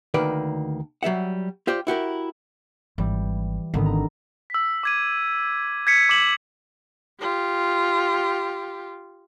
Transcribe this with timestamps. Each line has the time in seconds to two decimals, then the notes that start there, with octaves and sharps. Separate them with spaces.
0.14 D2 D#3 A#3 B4 D5
1.03 F#3 G3 E5 F#5
1.67 F4 G4 C5 D5
1.87 E4 F#4 G4 A#4
2.98 G#1 E3 G3
3.74 G#1 D3 D#3 B3
3.86 A#5
4.50 E6 B6
4.83 D6 G#6 D#7
5.87 G#6 B6 C#7
6.09 D6 B6 E7 F#7
7.20 F4 G4